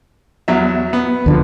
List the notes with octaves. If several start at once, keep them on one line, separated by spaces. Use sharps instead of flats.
E2 F#3 E5
B3
D#2 D3 F3